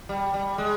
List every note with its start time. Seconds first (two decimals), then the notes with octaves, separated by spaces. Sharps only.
0.09 G3
0.34 G3
0.58 G#3